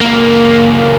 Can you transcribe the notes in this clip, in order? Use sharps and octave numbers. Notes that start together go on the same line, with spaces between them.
C#2 A#3